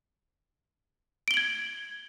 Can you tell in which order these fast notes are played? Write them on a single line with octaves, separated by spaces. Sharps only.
D7 G7 F#7 G#6